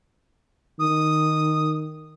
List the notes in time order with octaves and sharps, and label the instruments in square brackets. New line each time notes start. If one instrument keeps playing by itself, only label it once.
[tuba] D#3 [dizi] D#6